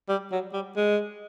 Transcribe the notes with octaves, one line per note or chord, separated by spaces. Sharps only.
G3
F#3
G3
G#3